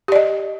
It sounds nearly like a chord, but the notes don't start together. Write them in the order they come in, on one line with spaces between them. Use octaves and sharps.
G4 D5 D#5